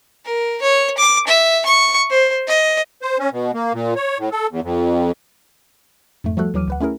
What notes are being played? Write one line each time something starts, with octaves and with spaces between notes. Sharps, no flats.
A#4
C#5
D6
E5
C#6
C5
D#5
C5
C#4
B2
A#3
A#2
C#5
A2
A4
E2
F2
F2 G#2 A3
F3 G3 A3 F#4 A4 F#6
D#2 E3 F#3 D6 F6 D#7
D2 B4 F#5
A3 C#4 E4 G#4 A#4